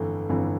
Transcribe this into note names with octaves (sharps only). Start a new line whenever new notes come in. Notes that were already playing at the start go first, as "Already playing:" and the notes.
Already playing: G1 F2 E3 A3
G1 F2 E3